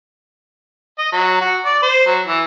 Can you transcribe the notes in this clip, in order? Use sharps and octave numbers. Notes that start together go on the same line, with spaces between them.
D#5
F#3
F#4
D5
C5
F#3
E3